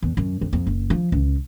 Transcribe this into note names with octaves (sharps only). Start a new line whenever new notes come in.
E2
F#2
F2
F2
F#1
F3
C#2